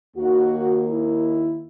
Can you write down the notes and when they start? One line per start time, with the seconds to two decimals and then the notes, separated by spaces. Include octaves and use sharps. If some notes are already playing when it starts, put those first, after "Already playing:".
0.16 D#2 D#3 A#3 F#4
0.88 E4